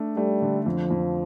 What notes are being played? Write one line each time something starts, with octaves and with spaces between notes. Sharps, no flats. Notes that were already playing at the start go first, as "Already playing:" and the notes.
Already playing: A3 D4
G3 A3
D3
F2 F3
F2